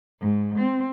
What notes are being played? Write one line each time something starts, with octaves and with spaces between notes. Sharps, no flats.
G#2
C4